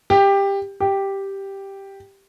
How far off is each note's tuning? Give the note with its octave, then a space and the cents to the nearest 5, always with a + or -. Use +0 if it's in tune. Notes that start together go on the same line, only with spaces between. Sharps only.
G4 +15
G4 +0